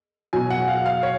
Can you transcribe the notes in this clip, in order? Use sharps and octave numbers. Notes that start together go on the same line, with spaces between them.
B2 F#3 G#5
F#5
F5
F5
C#5